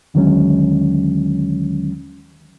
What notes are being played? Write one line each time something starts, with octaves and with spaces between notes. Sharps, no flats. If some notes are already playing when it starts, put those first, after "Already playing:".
D#2 D3 D#3 F#3 G#3 C#4